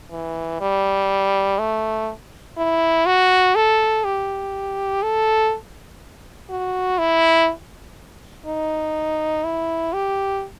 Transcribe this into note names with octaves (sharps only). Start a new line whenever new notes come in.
E3
G3
A3
E4
F#4
A4
G4
A4
F#4
E4
D#4
E4
G4